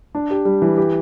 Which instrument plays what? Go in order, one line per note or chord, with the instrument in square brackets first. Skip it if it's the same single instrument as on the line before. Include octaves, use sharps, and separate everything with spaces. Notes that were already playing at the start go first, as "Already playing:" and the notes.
[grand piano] D4
G4
G3
E3
G4